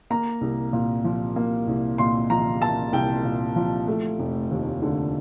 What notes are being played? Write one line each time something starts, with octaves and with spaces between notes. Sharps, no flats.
A#3 A#5
C2
A#2
F3
A#3
C2
A#2 C6
F3 A#5
A#3 A5
C2 G5
A#2
F3
A3
F1
D#2
D3